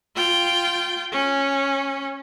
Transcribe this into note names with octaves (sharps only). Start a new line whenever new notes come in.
F4 G5
C#4